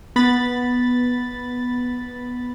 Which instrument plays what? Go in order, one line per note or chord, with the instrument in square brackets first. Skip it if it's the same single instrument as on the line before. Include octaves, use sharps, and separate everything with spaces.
[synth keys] B3 B5 A6